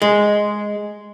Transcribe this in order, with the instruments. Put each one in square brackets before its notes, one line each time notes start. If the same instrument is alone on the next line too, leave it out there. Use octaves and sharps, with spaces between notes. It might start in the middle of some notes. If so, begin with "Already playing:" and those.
[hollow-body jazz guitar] G#3